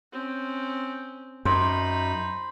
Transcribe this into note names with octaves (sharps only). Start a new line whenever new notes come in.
C4 C#4
F#2 D#4 C5 B5